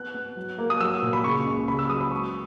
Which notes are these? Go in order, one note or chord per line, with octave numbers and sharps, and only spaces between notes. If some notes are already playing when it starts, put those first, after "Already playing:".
Already playing: B3 F#6
B3
F#3
A#3
D#6
F#3 E6
A#2
B5
C#3 C#6
C#2
C#3 B5
E6
F#3 D#6
B5
G#3 C#6